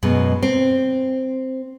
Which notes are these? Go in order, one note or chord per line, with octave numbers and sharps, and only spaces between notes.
F#2 B2 G#3
C4